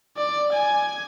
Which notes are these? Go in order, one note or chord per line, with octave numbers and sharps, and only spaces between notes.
D5
G#5